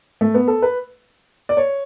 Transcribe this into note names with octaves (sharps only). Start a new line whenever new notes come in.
A3
B3
A4
B4
D5
C#5